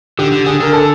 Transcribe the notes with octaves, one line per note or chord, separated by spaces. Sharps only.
D3 G4
D3
D3 G#4
D3 A#4
A4